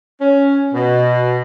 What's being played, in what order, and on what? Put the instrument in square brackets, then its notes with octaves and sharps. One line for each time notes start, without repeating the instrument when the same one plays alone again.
[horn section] C#4
B2